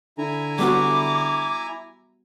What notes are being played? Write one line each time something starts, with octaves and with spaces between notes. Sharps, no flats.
D3 E4 G#5 A#5
G3 B3 F#4 D6